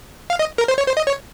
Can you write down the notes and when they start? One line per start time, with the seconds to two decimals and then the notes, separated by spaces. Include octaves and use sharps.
0.30 F5
0.39 D#5
0.58 A#4
0.68 C5
0.78 C#5
0.87 C5
0.97 D#5
1.07 C#5